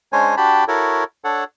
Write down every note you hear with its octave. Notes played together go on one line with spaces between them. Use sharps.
G#3 C#4 D4 C5 C#5 G#5
D4 F#4 G4 G5 A5 B5
E4 F#4 A4 A#4 C#5
D4 A4 C#5 F#5